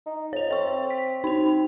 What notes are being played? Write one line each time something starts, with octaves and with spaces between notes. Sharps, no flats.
D#4
F2 C#5 F7
C4 C#5 C#6
B6
C4 D#4 F7